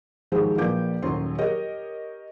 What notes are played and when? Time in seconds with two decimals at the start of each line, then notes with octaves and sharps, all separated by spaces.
0.32 D#3 F3 F#3 G#3 G4 C5
0.57 A#1 F3 A#3 B4 D6 G6
1.02 D#1 F#2 F#3 C5 C6
1.38 G4 A#4 C#5 D#5